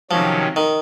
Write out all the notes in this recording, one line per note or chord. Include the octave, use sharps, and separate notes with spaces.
C3 D#3 F3 F#3 C#4
D#3